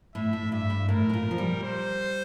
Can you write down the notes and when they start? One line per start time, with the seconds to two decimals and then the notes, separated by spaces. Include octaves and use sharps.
0.15 A2 E5
0.33 A2
0.52 G2 E5
0.70 G2
0.89 A2 A#4
1.10 A2
1.13 A#2
1.31 F3
1.38 G3
1.62 C5